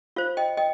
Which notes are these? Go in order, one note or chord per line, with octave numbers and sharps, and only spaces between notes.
F4 C5 F5
D#5 G5
D#5 G5